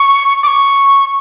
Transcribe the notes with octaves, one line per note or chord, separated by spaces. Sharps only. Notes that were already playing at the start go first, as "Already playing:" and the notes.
Already playing: C#6
D6
C#6